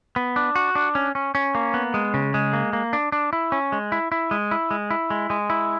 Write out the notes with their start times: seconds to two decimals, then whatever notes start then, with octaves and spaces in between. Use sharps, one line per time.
0.16 B3
0.36 D4
0.55 F#4
0.75 D4
0.95 C#4
1.15 C#4
1.35 C#4
1.55 A#3
1.74 B3
1.94 G#3
2.14 C#3
2.34 G#3
2.53 A#3
2.73 A#3
2.93 D4
3.12 D4
3.33 E4
3.52 C#4
3.72 G#3
3.92 E4
4.12 E4
4.31 G#3
4.51 E4
4.71 G#3
4.91 E4
5.10 G#3
5.30 G#3
5.50 E4